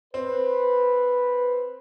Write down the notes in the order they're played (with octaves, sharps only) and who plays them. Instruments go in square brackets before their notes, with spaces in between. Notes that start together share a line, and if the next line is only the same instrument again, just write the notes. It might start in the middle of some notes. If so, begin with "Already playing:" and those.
[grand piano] C4 [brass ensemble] B4